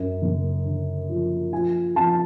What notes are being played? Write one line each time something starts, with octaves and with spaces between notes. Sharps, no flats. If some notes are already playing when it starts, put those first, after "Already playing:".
Already playing: F#2
F#1
D3
F3
F3 G#5
F2 A5